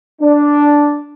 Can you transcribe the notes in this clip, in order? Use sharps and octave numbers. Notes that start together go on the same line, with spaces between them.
D4